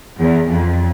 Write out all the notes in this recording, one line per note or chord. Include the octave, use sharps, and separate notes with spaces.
E2
F2